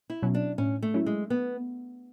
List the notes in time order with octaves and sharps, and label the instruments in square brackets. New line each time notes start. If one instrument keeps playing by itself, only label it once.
[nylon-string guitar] E4
[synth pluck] B2 F#3 C#4
[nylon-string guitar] D4
[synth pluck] A2 [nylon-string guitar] C#4
[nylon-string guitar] A3
[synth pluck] F#3 C#4 E4
[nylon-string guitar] G#3
B3